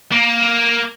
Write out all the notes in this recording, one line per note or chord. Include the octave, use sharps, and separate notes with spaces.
A#3